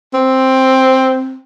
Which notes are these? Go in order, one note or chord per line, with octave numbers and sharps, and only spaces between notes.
C4